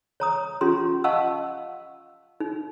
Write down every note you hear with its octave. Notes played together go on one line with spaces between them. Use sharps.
C#5 A#5 D#6
C#4 F4 G4 C6
D#5 F5 F#5 A5 C#6 E6
D#4